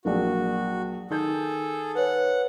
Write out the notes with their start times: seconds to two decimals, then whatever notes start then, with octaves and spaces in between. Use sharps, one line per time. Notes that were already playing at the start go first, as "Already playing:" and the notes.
0.05 A#1 F#3 A#3 F#4
1.10 D#3 G#4 A4 G6
1.95 B4 C#5 F#5